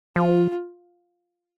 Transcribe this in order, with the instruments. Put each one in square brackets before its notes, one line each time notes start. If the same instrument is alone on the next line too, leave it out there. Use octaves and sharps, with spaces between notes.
[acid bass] F3 [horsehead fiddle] F4